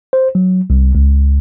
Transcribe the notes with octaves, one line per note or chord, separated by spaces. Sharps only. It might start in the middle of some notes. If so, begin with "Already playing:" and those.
C5
F#3
C2
C#2